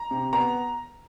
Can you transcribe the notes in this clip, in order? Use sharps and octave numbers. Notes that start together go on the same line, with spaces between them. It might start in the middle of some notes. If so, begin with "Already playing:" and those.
Already playing: A#5
C3
B3 A#5